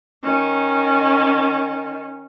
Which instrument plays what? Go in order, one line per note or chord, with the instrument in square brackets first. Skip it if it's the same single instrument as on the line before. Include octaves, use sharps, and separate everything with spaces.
[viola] D#3 C#4